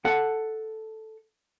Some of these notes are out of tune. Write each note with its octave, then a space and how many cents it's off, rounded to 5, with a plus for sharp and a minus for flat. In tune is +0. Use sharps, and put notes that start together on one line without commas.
A4 +0 F#5 +0